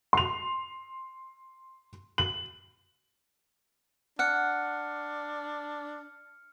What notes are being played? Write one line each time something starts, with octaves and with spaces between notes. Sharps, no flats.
C6 F7
F#7
D4 F#5 F6 C#7